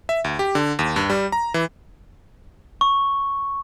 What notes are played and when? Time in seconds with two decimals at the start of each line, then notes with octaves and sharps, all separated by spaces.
0.09 E5
0.24 D2
0.39 G4
0.55 D3
0.79 D#2
0.96 G2
1.10 G3
1.32 A#5
1.54 E3
2.81 C#6